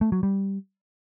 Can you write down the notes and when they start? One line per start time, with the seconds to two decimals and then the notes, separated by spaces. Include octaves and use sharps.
0.01 A3
0.12 F#3
0.23 G3